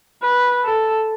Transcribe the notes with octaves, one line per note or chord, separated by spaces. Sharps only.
B4
A4